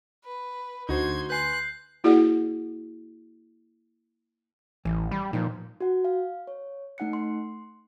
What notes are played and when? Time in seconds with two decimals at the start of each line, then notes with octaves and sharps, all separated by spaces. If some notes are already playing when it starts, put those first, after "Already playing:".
0.24 B4
0.89 D2 D#4 F#4 C5 C6 G#6
1.30 B4 G#5 C6 F#6 G6 C7
2.04 A#3 E4 F#4 G#4 D5 F#5
4.85 A1 E3
5.11 G3 B5
5.33 A#2 F3 D#4
5.81 F#4 F#5
6.05 F5
6.47 C#5
6.98 A3 D#4 F#5 F#6 C#7
7.13 C6